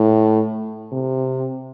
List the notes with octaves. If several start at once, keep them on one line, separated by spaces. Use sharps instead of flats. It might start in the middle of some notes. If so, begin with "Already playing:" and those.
Already playing: A2
C3